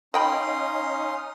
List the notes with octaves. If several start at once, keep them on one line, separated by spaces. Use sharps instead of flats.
C#4 D#4 D#5 F5 G5 B5 C6 D#6